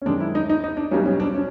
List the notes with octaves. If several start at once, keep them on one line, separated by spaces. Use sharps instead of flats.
C#4
F#2 D#3 G#3 D4
E4
D#4
D#4
D#4
D4
B1 B2 G3 C#4
C#4
D4
C#4